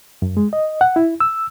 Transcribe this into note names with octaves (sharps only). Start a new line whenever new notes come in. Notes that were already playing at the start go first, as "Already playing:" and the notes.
F#2
G#3
D#5
F#5
E4
E6